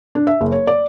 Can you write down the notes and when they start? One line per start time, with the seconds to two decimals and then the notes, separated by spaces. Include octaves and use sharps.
0.15 D4
0.27 E5
0.41 F#1
0.52 C#5
0.67 D5